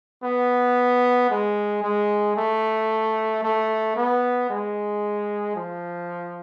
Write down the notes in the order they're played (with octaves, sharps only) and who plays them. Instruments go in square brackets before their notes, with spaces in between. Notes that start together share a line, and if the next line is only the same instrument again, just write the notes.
[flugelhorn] B3
G#3
G#3
A3
A3
B3
G#3
F3